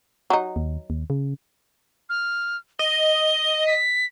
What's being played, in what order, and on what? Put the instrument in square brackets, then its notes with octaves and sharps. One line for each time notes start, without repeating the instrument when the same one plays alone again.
[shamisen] F#3 D#4
[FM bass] D#2
D#2
C#3
[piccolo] F6
[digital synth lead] D#5 [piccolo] G7
[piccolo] B6